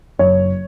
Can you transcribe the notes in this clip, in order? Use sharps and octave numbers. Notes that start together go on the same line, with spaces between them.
F#1 C#5